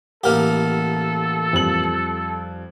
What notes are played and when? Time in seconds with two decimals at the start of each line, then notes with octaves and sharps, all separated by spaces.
0.24 A1 A#3 G4 A4 F#5 F6
1.53 F2 G3 F#7